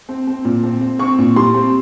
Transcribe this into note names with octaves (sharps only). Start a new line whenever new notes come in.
C4
C4
A#2
C4
C4
C4 C#6
A#2
G3 C6
C4